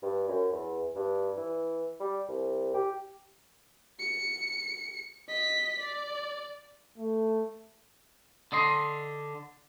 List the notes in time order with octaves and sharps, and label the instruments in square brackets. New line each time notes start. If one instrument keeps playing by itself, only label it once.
[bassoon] G2
F#2
E2
G2
E3
G3
C2
G4
[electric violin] C#7
D#5 B6
D5
[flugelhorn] A3
[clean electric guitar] D3 D#5 C6